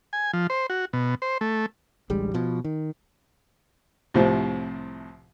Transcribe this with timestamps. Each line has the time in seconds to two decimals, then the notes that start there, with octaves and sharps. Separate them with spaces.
0.13 G#5
0.33 F3
0.50 C5
0.70 F#4
0.93 B2
1.22 C5
1.41 A3
2.10 A1 D2 G3 G#3
2.34 B2 F3
2.64 D#3
4.14 C2 A2 C3 F3